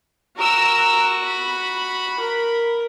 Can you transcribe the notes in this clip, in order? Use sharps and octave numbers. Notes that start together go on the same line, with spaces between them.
F#4 A#4 A#5 E6
B5
A#4